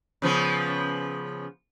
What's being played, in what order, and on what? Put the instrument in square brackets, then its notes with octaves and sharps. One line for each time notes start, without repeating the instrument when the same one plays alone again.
[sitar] C#3 F3 B3